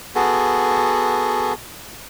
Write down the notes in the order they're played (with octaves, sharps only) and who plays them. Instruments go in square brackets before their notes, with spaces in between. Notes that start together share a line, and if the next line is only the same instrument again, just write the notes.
[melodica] B3 F#4 G#4 A4